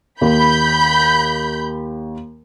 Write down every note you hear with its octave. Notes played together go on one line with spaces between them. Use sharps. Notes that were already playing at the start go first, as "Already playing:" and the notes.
D#2 B5 G6